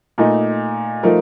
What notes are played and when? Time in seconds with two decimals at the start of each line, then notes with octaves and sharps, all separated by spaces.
0.18 A#2 A3 D#4
1.03 F3 A3 D#4 A#4